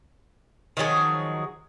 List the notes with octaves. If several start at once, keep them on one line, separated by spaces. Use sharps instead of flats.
D#3 F3 F#3 G#4